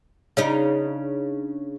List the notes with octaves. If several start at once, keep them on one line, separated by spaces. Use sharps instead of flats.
C#3 D4 D#4